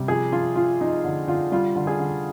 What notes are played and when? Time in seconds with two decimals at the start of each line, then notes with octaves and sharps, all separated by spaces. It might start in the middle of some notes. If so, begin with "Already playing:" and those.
Already playing: C3 G3
0.08 F3 G#4
0.32 F3 F4
0.56 F3 F4
0.81 F3 D#4
1.04 D3
1.27 D3 F4
1.52 G3 F4
1.76 D3
1.87 G#4
2.00 D3